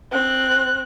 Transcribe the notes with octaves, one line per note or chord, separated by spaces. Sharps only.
C4 F#6